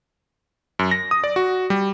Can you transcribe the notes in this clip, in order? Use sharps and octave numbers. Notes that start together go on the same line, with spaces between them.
F#2
A#6
D#6
D5
F#4
G3